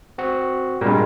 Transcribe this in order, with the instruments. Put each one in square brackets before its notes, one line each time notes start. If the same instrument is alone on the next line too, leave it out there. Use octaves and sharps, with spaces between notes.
[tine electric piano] C4 F#4 F#5
[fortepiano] G2 A#2 [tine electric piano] G3 G#3